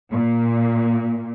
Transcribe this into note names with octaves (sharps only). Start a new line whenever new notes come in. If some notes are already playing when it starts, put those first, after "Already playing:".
A#2